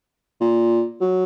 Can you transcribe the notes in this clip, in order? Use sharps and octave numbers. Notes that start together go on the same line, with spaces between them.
A#2
F#3